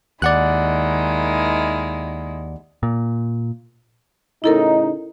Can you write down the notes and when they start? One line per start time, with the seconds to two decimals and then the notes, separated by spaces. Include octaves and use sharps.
0.22 D#2 D#3 G#3 E4 D5 F#5 F#6
2.83 A#2
4.44 A2 C#3 D#4 E4 A4 A#4